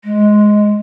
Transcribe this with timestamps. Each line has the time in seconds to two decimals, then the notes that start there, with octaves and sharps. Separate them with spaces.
0.04 G#3